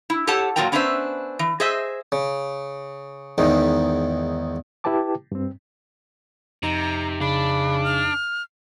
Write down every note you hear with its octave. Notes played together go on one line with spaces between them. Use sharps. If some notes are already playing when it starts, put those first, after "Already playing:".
E4
G4 A4 C#5 F#5 A5
A#2 F#3 C4 F4 A#4 G5
B3 C#4 D4 B4 C5 E5
E3
G#4 C5 D#5 E5
C#3
E2 G#2 D#3
E4 G4 B4 G5 A5 D6
G2 C4
F2 C3 D#4 A#5
C#3 D4 B5
F6